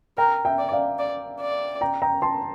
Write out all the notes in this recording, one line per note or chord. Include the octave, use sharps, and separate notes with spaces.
A#4 G5 A#5
E5 G5
D5
D5 F5
D5
D5
G5 A#5
G5 A#5
A5 C6